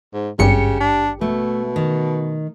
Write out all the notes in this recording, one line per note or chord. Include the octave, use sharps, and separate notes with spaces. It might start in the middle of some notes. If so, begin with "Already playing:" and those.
G#2
G#1 G2 C#3 G4 C#7
D4
B2 A3
D#3